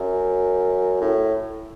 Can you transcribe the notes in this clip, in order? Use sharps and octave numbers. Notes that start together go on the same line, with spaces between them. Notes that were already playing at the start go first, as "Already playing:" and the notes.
Already playing: F#2
A2